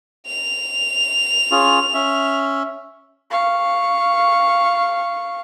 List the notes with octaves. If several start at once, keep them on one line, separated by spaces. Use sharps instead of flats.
F7
C#4 F4 G#4
C#4 E5
F5 C#6